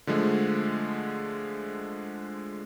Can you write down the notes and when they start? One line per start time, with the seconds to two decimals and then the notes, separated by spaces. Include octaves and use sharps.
0.07 D3 F3 G#3 A3